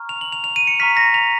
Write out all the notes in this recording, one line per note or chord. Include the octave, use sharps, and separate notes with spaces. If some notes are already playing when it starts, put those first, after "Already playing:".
Already playing: A#5 C#6 F6
F7
F#7
F7
F7
D#7
C#7
A#5 C#6 F6 B6
A#6
F7